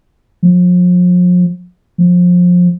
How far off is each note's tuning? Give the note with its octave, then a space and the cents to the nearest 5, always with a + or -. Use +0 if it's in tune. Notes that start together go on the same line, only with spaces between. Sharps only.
F3 +40
F3 +25